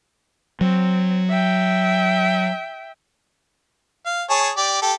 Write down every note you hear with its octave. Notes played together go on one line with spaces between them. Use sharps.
F#3 C4
E5 G5
F5
G#4 C#5 A5
G4 D5
G4 A4